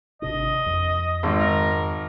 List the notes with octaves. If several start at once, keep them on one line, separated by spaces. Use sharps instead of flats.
G#1 C3 D4 D#5
F2
G#1
A#4